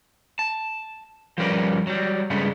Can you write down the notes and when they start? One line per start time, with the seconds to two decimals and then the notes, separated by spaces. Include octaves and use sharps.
0.39 A5
1.38 F3 G3 C#4 A#4 B4 D5
1.87 F#3 G3
2.30 G2 C#3 G#3 A3 B3